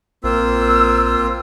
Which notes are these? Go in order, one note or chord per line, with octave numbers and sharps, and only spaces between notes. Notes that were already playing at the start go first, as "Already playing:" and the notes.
A#1 A#3 C4 F4 E6